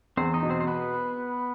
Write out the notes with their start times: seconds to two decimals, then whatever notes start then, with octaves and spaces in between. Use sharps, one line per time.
0.17 E2 C4 C5
0.34 D#4 D#5
0.43 B2
0.50 C4 C5
0.61 C5
0.67 B3 B4